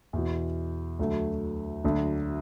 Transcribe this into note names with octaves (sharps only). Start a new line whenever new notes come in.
E2 B2 B3 E4
D2 D3 F#3 A3
D2 D3 F#3 D4